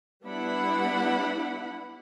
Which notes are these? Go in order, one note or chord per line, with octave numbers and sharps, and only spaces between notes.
G3 B3 D4 E4 F#5 B5